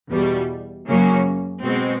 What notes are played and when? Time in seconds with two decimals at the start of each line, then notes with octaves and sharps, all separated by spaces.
0.10 E2 B2 G3
0.87 F#2 C#3 F#3 A#3 C#4
1.64 B2 G#3 C4